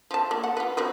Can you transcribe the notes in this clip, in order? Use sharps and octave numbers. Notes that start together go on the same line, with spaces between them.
F3 A5
A#3
F#5
F4 B4
F#3 C4 B4